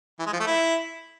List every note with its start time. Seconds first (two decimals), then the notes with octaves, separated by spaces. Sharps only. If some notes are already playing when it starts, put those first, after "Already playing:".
0.19 E3
0.26 G#3
0.33 F3
0.40 A3
0.47 E4